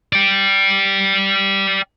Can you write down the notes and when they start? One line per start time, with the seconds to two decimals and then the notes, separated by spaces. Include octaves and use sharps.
0.13 D5 G5